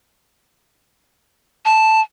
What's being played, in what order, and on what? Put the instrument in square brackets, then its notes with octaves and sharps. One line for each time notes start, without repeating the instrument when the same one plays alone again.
[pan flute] A5